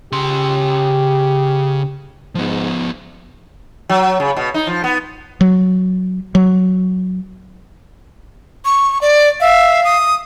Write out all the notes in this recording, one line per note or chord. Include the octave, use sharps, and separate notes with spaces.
C#3 G4 C6
G#2 F3 B3
F#3
C#3
B2
D#4
F3
B3
F#3
F#3
C#6
D5
E5 F5
D#6